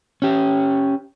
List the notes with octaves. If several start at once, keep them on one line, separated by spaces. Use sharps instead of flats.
C#4 G4